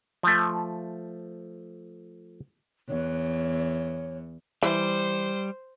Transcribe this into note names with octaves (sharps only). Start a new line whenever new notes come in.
F3 A3
E2 C#5
E3 G3 C5